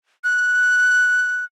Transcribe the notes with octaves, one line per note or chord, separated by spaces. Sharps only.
F#6